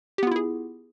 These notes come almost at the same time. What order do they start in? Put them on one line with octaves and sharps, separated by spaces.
G4 B3 F4 E4 G#4